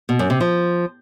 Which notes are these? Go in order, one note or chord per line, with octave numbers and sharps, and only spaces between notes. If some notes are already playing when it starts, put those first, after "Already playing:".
B2
F#2
C3
F3